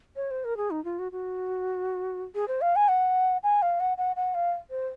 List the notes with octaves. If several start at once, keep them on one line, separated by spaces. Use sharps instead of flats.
C#5
C5
A#4
G#4
D#4
F4
F#4
F#4
G#4
C5
F5
G#5
F#5
G#5
F5
F#5
F#5
F#5
F5
C5